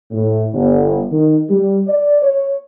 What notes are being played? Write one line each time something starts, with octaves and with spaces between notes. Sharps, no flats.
A2
G1
D#3
G3
D5
C#5